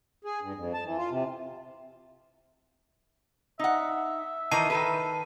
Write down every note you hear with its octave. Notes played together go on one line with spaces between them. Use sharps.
G#4
G2
F2
A5
E3
F4
C3
D#4 E5 F#5
D#3 E3 D#4 A5 C7 D#7
D#3 A4 B4